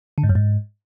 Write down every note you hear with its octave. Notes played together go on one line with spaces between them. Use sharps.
D3
G#2
F#2
G#2